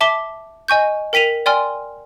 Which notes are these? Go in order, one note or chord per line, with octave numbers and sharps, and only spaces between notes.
E5 A5 D6 B6 G7
D#5 G#5 C#6 G6
A#4 G5 B6 D#7 F7
D5 G5 G#5 C6 F6